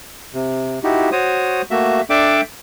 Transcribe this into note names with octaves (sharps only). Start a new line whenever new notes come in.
C3
D#4 E4 F#4 G4
F#4 C5 C#5 D#6
A3 A#3 F#4 E5
D4 A4 D5 E5 G5 D6